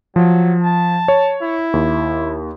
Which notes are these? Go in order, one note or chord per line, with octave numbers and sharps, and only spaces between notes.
F3 F#3
A5
C#5
E4
D#2